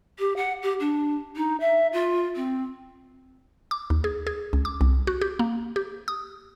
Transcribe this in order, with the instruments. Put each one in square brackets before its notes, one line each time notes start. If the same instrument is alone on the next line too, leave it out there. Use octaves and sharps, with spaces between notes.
[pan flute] G4
F#5
G4
D4
D#4
E5
F4
C4
[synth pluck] D6
D#2
G#4
G#4
C#2
D6
C2
F#4
G4
A#3
G4
D#6